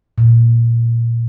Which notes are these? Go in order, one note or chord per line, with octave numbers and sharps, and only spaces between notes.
A#2